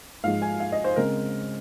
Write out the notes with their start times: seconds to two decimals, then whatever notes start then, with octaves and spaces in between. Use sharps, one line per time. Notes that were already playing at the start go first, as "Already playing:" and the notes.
0.24 G#2 F3 G#3 F5
0.42 G#5
0.60 F5
0.72 D#5
0.84 C5
0.96 C#3 G#3 C4 A#4